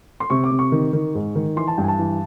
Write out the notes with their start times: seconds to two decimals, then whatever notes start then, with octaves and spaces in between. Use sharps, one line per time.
0.20 C6
0.30 C3 C#6
0.44 D6
0.51 C3
0.59 C#6
0.72 D#3
0.93 D#3
1.15 G#2
1.35 D#3
1.56 E3 C6
1.67 A5
1.78 G2 G5
1.84 G#5
1.88 A5
1.99 E3